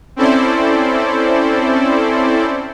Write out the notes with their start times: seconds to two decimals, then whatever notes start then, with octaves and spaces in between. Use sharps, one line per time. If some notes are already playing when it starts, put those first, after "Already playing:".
0.16 C4 C#4 E4 A4 C5 D5